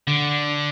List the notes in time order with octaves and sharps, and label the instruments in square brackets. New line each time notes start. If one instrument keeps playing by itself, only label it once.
[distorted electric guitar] D3